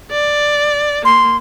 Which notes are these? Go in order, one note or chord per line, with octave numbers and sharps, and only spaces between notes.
D5
A#3 C6